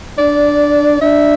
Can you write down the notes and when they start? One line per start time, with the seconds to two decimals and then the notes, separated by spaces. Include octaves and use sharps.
0.18 D4 D5
1.01 D4 E5